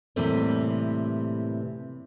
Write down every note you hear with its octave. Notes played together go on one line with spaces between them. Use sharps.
A2 C3 E3 G3 A#3 C4